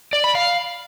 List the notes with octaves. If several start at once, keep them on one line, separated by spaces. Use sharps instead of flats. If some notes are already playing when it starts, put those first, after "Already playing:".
D5
B5
F5